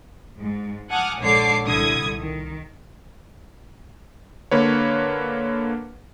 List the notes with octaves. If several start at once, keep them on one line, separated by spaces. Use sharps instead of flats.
G#2
F#5 G#5 A5 D6 D#6 F6
A#1 G#2 D3 C#5 D6 C7
C2 D3 E4 D#6 G#6
D#3
D3 A#3 B4 C#5